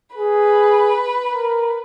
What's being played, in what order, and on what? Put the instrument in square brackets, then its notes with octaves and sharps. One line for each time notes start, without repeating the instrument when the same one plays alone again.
[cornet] G#4 [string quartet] B4
[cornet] A#4